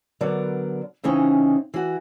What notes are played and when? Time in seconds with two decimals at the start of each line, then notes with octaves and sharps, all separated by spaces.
0.21 D3 F#3 B3 A#4 D5
1.04 C#3 E3 C4 C#4 D#4
1.74 E3 F#4